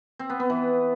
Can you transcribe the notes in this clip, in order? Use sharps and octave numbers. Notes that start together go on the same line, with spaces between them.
C4
B3
B3
E3